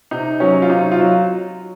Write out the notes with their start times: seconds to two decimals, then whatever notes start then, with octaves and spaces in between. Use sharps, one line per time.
0.11 C3 D#4
0.40 F#3 C#4
0.62 F4
0.69 C3 D#4
0.91 F4
0.99 F#3